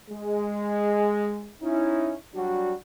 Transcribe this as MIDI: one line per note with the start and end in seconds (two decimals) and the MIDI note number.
0.10 1.48 56
1.62 2.13 61
1.62 2.13 63
1.62 2.13 64
2.35 2.72 54
2.35 2.72 55
2.35 2.72 62
2.35 2.72 66